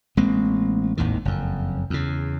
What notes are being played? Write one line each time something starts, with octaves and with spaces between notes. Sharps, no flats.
A1 G#3 A#3 C4
G#1 D#2 A2 D#3
F#1 F2
E2 C#3